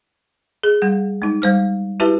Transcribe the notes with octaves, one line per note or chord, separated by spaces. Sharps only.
G#4
G3 F#5
G#3 D#4
G3 C5 F6
E4 F#4 G4 B4 E5 A5